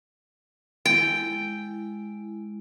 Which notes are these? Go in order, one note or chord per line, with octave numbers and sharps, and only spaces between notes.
G#3 E4 G5